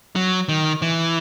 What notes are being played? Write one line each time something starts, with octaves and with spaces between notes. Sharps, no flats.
F#3
D#3
E3